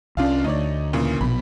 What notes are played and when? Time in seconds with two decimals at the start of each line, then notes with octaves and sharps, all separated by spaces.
0.17 C2 C#4 D4 F4 F5
0.44 D2 D#4 C#5 D5
0.93 A#2 C#3 E3
1.21 A#1 B2 B5